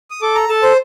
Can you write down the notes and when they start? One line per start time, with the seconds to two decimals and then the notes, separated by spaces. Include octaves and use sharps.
0.11 D#6
0.22 A4 D6
0.35 A#5
0.49 A4 A5
0.63 C5